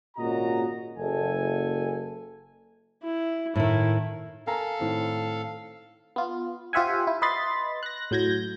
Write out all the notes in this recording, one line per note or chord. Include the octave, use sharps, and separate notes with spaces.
G#1 A#2 C#3 F#4 D#5 A#5
F#1 A4 G#5
E4
A2 D#3 E4
A4 A#4 F5 G#5 A#5
A2 D#3 C4
B3 F4
F4 G4 C5 E5 F#5 G#5
E4
B4 D#5 B5 C6 A6
F#6 A#6
A2 F#3 G6 G#6 A#6